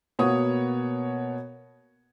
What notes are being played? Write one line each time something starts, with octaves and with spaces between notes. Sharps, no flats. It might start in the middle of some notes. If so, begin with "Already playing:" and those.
B2 A#3 B3 C#5 F#5 D#6